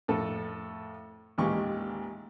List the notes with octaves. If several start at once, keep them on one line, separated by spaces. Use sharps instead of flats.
F2 A2 A4
A1 D#2 A#2 G#3 G4 C#6